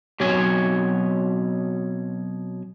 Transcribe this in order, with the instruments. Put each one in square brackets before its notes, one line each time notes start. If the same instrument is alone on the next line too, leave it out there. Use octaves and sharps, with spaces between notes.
[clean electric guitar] B2 F#3 C4 F#4 C#5 G#5